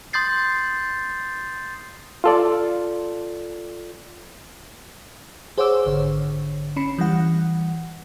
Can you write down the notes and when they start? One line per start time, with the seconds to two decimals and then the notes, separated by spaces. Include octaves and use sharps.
0.13 C6 D#6 G6 A6 C7
2.24 F4 A4 D5
5.58 G#4 C5 C#5 F#5 D6 E6
5.86 G#1 D3 C#5
6.76 C#4 B5 C#7
6.98 E3 G3 F#5